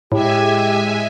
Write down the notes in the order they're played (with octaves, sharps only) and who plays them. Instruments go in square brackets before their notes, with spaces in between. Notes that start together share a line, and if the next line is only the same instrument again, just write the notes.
[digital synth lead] A2 [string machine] G#3 E5 G#5 [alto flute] G4